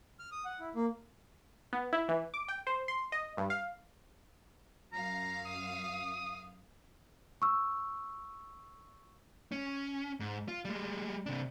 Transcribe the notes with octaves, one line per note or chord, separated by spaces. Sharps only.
F6
D#6
F#5
E4
A#3
B3
E4
E3
D6
G5
C5
C6
D#5
G2
F5
F#2 F5 A#5
D#6
C#6 E6
C#4
G#2
F4
G3 G#3
C3 D4